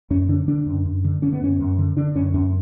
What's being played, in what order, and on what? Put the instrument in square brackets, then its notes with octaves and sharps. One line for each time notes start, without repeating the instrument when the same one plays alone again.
[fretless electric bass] F#2 C#4
D3 D4
D3 D4
F#2
F#2
D3
D3 C#4
B3
F#2 C#4
F#2
D3
D3 D4
F#2 C#4
F#2 C#4